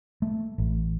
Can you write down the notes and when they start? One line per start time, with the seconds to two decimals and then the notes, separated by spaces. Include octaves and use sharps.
0.22 A3
0.58 A1